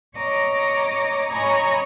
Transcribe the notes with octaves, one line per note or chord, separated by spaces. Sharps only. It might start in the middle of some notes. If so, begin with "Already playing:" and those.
C#5 D#5 A#5 D6
C#5 D#5 G#5 A#5 B5